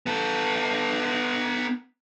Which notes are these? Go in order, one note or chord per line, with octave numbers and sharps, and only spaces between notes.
B3 A4